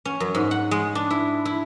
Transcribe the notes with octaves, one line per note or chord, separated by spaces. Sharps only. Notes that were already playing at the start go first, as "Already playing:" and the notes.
C#4
F#2
G#2
F#5
G#3
D4
E4
E4